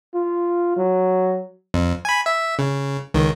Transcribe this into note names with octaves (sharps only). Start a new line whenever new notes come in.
F4
F#3
F2
G#5 B5
E5
C#3
C#2 D#3